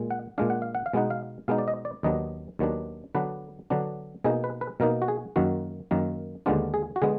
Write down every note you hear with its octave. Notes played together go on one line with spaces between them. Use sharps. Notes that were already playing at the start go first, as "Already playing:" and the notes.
Already playing: A#2 G#3
F#5
A#2 G#3 D4 F5
F#5
F5
F#5
F5
B2 G#3 B3 D#4 F#5
F5
B2 G#3 B3 D#4 F5
D5
D#5
D5
D#2 D#3 F#3 B3 D4 D#5
D#2 D#3 F#3 B3 D4
D3 F#3 B3 D4 B4
D3 F#3 B3 D4
B2 A#3 D#4 G#4
B4
B4
B2 A#3 D#4 A#4
F#4
G#4
F#2 D#3 A#3 F#4
F#2 D#3 A#3
D#2 D3 G#3 B3 D4 F4
G#4
F#4
D3 G#3 B3 G#4